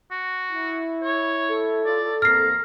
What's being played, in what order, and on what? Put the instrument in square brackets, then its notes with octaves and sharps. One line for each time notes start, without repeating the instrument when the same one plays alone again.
[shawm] F#4
[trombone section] E4
[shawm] C#5
[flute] A4
[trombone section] F4 [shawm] D5
[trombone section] E2 A#3 C4 [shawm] A#5 [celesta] F6 C7